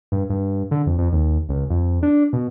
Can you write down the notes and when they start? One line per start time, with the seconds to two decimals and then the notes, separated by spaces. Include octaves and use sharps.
0.12 G2
0.30 G2
0.71 D3
0.86 F2
0.99 F2
1.12 D#2
1.49 C#2
1.70 F2
2.03 D4
2.33 B2